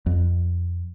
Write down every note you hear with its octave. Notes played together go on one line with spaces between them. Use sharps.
F2